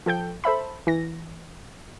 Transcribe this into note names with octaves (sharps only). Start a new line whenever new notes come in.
F3 A4 G5 G6
A4 C5 E5 B5
E3 A#6